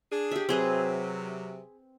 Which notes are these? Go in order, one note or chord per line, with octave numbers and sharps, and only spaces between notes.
D4 G#4
G4 E5
C3 F#3 C4 G#4 B4